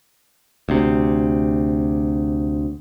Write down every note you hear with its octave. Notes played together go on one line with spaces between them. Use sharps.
D2 C3